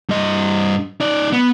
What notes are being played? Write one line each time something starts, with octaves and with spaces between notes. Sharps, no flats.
G2 D#5
D#4 D5
B3